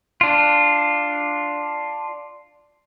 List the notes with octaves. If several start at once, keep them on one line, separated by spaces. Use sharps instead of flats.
D4 F4